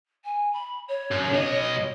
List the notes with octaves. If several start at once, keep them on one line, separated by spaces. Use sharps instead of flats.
G#5
B5
C#5
F#2
B1 D#5
C#5